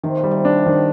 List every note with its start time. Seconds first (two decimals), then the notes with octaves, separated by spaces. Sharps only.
0.03 C3 D#3
0.17 A#2
0.23 G3
0.31 C3
0.45 A#2 D4
0.59 C3
0.66 D#3
0.73 D3